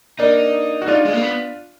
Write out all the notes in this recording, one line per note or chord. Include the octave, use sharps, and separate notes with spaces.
A#3 D4 D#4
F#4
D4 D#4 F4
G#3
A#3
B3